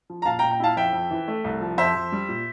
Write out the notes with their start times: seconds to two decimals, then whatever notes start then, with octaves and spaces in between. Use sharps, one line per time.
0.10 F3
0.22 A#5
0.26 A#2 F5 A5
0.39 G5 A#5
0.43 A#2
0.51 G5 A#5
0.60 E4 F5 A5
0.76 F2 E5 G5
0.93 F2
1.11 E3
1.28 A3
1.44 C2
1.61 F3
1.78 F2 C5 E5
1.95 F2
2.12 G3
2.29 A#2